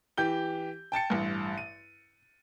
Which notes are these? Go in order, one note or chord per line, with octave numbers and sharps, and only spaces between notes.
E3 G4 G6 G7
G5 A5 A6 C#7
A1 G2
D#7